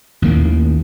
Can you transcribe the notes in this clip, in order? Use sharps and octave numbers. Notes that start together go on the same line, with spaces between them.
A1 D#2 D#3 A#3